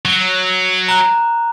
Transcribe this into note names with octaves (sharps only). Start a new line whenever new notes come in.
F#3
A#5 F#6